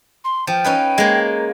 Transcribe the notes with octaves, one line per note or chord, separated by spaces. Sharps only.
C6
F3 G5
C#4 D#4 B4
G#3 A#3